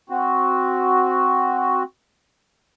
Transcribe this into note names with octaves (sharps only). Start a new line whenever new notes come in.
C4 F#4